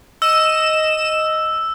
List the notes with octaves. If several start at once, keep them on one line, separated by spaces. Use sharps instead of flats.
D#5 E6 E7